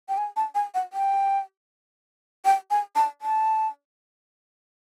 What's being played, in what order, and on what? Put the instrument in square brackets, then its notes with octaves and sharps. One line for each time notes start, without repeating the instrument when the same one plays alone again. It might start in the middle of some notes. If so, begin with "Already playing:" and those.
[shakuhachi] G5
G#5
A5
G#5
F#5
G5
G5
G#5
A5
A5